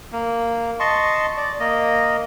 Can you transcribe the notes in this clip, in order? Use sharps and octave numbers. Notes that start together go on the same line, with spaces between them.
A#3
D#5 A5 C6 C#6
D5
A#3 D#5